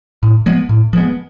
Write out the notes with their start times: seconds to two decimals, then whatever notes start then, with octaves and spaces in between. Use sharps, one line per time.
0.23 A2
0.46 F3 G#3 B3
0.69 A2
0.93 F3 G#3 B3